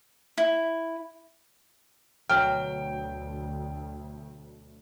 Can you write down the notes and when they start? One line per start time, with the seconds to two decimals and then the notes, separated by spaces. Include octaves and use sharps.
0.38 E4
2.30 D2 B2 F#3 A#4 G5 F6